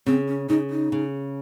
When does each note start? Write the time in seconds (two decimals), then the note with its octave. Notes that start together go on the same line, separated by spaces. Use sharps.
0.06 C#3 C4
0.28 C#4
0.49 C#3 D#4
0.70 D#4
0.92 C#3